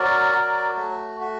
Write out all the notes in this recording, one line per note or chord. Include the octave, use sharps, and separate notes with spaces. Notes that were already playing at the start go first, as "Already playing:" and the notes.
Already playing: F#3 F#4 A#4 D5
F#4
A3
F#4